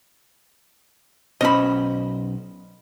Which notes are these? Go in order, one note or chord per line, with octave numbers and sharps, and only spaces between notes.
B1 C#4 C5 D#5 B5